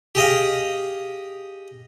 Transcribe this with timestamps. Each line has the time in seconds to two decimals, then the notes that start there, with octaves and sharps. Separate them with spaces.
0.15 G4 G#4 D#5 F5